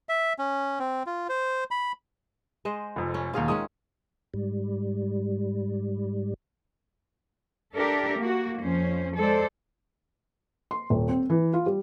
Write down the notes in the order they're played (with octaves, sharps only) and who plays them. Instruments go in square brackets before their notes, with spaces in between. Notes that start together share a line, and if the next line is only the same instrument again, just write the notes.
[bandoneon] E5
C#4
C4
F4
C5
B5
[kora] G#3 C5 D#5
[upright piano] F1 F2
[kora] C#4
[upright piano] E1 D#2 [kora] F4 G#4 F5
[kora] D#3 G#3 C#4 [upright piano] D#6
[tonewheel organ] G#2 G3
[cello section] D4 G4 A4 A#4 E5
A#3 F#4
F2 F3 C#4 C5
G#3 A4 C5 D5
[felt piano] C6
D#1
C4
E3
F4
G3